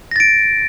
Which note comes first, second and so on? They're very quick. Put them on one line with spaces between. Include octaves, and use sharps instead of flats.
A#6 A6 D7